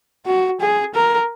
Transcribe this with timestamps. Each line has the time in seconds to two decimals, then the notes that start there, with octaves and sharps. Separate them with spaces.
0.26 F#4
0.61 G#4
0.94 A#4